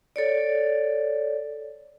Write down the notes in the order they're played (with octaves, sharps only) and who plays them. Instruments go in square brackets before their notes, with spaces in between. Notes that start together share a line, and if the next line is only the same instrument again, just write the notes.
[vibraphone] A4 C#5 D5